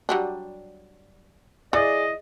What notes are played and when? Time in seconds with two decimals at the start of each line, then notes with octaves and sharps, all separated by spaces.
0.09 F#3 G3 D4
1.73 E3 G#4 D5 D#5